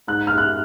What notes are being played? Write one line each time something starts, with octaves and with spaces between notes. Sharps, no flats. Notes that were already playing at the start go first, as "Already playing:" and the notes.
G#2 F#6
F6
F#6